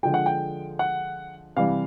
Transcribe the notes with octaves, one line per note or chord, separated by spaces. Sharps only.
D3 F3 G#3 G5
F#5
G5
F#5
C3 E3 G3 F5